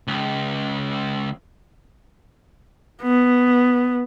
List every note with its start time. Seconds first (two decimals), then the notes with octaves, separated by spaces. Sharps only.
0.07 C#2
3.02 B3